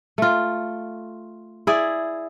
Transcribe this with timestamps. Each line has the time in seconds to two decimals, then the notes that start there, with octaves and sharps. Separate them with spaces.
0.18 A3 F4
1.67 E4 G#4 D5